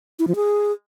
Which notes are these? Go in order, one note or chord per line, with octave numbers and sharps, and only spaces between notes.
E4
F3
G#4